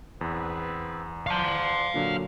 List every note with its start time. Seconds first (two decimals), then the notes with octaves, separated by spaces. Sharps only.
0.21 E2 B3 C4 B4
1.27 D5 F5 F#5 A5 C6
1.94 A#2 D3 F#3